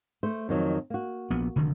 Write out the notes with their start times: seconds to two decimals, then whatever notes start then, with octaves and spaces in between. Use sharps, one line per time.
0.23 A3 C5
0.49 F2 D#3 F#3
0.90 A#3 F#4
1.30 A#1 B3
1.56 F1 D3 D#3